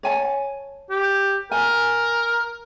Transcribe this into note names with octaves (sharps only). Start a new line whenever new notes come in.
C#5 G#5 A5
G4
A#4 G#5